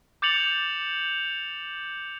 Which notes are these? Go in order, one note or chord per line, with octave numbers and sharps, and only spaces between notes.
D6 G6 A6 C#7 F7 F#7